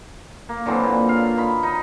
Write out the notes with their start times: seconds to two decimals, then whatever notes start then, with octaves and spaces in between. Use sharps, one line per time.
0.49 A#3
0.66 D3 E3 F#3 C4
0.84 A#2
1.09 F5
1.37 D#3 B5
1.63 D#4